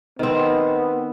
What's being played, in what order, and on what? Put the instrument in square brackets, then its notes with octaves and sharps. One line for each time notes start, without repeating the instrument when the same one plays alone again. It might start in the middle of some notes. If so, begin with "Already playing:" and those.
[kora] D#3 C4 [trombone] B3